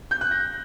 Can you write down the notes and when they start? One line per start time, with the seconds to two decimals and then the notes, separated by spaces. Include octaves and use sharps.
0.11 G6
0.21 F#6
0.31 A#6